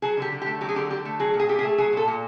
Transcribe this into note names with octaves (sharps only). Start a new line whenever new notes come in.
F#3 G#4
D3 G4
D3
G4
A3
F#3 G4
G#4
D3 G4
D3 G4
A3
F#3 G#4
A#2
G#4
A#2 G4
G#4
A3
F#3 G#4
A#2 A4
A#2